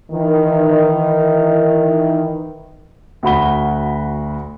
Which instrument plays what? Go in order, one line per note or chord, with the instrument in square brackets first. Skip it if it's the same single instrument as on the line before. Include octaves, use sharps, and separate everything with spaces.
[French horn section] D#3 E3
[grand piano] D2 F#4 B5 G7